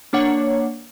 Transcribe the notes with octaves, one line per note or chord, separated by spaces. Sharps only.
A#3 D4 C#5 F#5